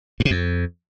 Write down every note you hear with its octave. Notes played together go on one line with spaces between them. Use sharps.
G2
C3
F2